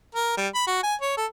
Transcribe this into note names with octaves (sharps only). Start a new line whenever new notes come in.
A#4
G3
B5
F#4
G#5
C#5
A4